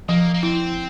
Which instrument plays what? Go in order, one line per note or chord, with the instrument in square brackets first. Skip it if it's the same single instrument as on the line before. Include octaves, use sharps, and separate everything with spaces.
[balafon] F3 [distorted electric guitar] A#3
[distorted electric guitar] A#3
[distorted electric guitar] C4 [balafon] E4